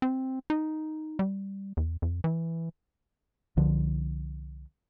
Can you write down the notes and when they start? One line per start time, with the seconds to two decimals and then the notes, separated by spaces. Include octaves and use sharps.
0.02 C4
0.50 D#4
1.19 G3
1.77 E2
2.02 F2
2.24 E3
3.57 C2 D3 F3